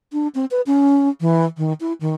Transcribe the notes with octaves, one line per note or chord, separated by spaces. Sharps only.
D4
C4
B4
C#4
E3
D#3
E4
D#3